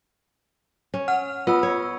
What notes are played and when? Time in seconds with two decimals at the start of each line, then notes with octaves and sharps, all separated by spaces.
0.94 C#4
1.08 F#5 F6
1.47 B3 F4 E6
1.63 C#5